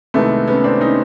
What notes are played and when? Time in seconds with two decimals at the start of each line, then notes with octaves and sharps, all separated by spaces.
0.14 C2 C3 D#3 G#3 A3 B3
0.48 B3 C#4
0.64 C4 D4
0.81 C#4 D#4